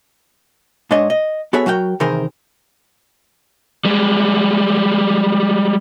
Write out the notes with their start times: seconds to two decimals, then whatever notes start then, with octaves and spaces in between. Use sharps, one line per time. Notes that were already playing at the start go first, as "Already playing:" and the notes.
0.91 G#2 G#3 D4 C#5 D#5
1.10 D#5
1.53 B3 F#4 G#4 A4 C#5 E5
1.66 F#3 F#4 A#4 G5
2.00 C3 D#3 E3 G#4 A#4 C5
3.85 G3 G#3